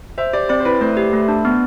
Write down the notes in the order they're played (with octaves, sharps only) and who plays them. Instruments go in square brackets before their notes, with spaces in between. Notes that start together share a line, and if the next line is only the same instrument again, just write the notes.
[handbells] C5 [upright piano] E5
[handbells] G4 [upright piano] D5
[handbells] C4 [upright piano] D5
[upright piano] C5
[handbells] E4 [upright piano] B4
[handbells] A3 [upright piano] C5
[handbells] G4
A3
D4
B3